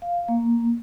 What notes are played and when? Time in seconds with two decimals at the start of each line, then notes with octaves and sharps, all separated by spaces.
0.02 F5
0.28 A#3